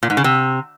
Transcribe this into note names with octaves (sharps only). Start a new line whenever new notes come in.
A#2
G#2
C#3
C3